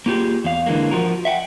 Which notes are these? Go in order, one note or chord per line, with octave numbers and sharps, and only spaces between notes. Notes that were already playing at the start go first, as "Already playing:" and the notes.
A#3 F4 G4 G#4
E2 F5
D3 E3 G#3 A#3
F3 F#4 A#4
E5 F#5 G5